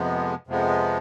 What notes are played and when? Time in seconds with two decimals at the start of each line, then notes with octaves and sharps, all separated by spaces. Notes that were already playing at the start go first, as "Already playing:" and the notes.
Already playing: F2 C3 F3 G#3 B3
0.47 F2 C3 F3 G#3 B3